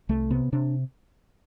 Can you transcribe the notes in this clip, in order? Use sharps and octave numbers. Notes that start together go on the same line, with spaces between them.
C2 A3
C3 B3
C3 D4